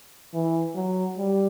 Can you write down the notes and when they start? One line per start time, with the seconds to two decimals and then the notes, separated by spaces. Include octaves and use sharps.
0.34 E3
0.75 F#3
1.18 G3